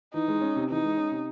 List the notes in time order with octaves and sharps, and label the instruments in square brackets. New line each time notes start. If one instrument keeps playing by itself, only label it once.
[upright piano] E3 [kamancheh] D#4
[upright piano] G#3
C#4
C3
[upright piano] E3 [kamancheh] D#4
[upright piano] G#3
C#4
C3